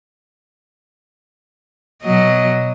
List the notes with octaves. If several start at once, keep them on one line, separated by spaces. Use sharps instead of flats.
B2 F#3 D#5